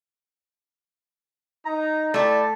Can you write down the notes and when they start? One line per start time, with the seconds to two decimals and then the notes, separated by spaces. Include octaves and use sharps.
1.66 D#4 A#5
2.14 A3 E4 A4 D5 E5 G5